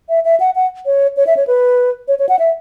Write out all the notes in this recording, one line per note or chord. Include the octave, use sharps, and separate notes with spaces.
E5
E5
F#5
F#5
C#5
C#5
E5
C#5
B4
C#5
C#5
F#5
E5